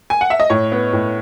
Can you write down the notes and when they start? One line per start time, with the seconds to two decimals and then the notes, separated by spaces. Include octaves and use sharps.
0.10 G#5
0.21 F#5
0.30 E5
0.40 D#5
0.50 A2 C#5
0.72 B3
0.93 A2